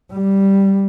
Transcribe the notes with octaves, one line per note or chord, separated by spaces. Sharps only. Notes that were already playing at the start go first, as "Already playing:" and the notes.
G3